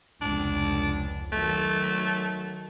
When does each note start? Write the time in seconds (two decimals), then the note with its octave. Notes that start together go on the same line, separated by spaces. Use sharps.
0.21 F1 C#2 D4
1.32 D#3 F#3 A3